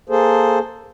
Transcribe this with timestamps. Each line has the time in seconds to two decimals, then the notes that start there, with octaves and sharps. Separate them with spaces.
0.09 A#3 G#4 A4 C5